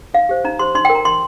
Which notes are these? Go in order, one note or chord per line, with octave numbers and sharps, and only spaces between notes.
D#4 F5
G4 C5
D#4 A#5
G4 C5 C6
D#4 C6
A#4 G5
A#5
D#4 C6